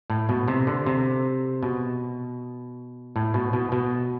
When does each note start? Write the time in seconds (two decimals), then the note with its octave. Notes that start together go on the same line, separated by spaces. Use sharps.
0.10 A2
0.29 B2
0.48 C3
0.67 D3
0.86 C3
1.63 B2
3.16 A2
3.34 B2
3.53 B2
3.72 B2